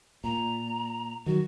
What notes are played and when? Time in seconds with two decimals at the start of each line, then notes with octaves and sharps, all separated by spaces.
0.24 A#2 A#5
1.26 D#3 F#3 F#4